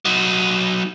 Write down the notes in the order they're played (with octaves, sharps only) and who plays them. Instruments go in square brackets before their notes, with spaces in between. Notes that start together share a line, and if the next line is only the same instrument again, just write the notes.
[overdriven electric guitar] F#3 D#4